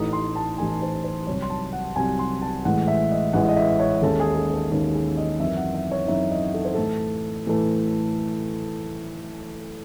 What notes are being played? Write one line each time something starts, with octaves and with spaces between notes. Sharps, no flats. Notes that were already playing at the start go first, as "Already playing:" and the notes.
Already playing: A1 A2 E3 A3 D#4 D#6
C6
A5
A1 A2 E3 A3 D#4 G#5
C5
C5
C2 C3 F#3 C#5
C6
A5
F#5
C2 C3 F#3 G#5
C6
A5
A1 A2 E3 G#3 F#5
E5
D#5
A1 A2 E3 G#3 F#5
D#5
E5
C#5
D#2 D#3 G#3 C#4 A4
G#4
A4
A4
D#2 D#3 G#3 C#4 G#4
G#4
D#5
F#2 E3 C4 D#4 E5
F#5
E5
C#5
F#2 E3 C4 D#4 E5
D#5
A4
C5
A2 E3 A3 A4
A2 E3 A3